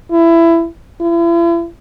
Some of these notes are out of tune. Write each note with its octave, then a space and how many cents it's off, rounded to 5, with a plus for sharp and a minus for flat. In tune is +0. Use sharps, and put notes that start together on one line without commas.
E4 +20
E4 +40